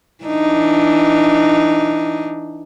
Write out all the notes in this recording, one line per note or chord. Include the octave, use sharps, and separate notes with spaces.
E3 D4 D#4